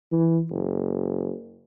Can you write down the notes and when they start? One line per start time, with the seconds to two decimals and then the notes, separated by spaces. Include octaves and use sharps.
0.12 E3
0.51 F#1